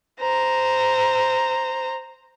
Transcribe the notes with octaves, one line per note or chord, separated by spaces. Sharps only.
C5 A#5